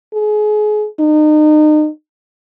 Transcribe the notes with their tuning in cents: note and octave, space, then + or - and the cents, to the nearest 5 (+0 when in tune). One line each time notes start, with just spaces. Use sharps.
G#4 +30
D#4 -35